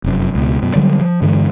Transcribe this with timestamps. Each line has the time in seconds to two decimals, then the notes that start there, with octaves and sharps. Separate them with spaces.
0.04 F1 F#2
0.35 C#2 B2
0.62 F#2 B2
0.76 D3 F#3 G3
0.99 F3
1.22 G2 D3 E3 G#3